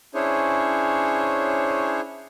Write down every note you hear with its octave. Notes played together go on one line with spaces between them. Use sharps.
C#4 D4 E4 G#4 C5 C#5